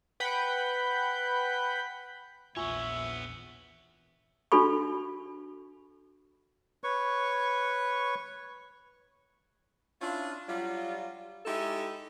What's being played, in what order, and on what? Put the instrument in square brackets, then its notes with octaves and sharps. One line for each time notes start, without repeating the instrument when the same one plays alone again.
[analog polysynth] B4 F#5 G5 B5 G6
[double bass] A#1 E2 [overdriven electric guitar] B3 C#5 [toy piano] F4 G#5 C#6 [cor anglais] E5
[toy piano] D4 F#4 A4 B5 C#6
[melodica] B4 C#5 C#6
[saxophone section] C#4 D4 E4 F4
F#3 G3 F4
G#3 D#4 E4 G4 A4 E5